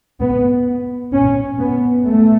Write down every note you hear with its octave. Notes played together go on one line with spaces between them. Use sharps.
B3
C#4
B3
A3